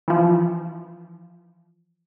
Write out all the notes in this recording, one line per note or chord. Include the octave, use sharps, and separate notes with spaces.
E3 F3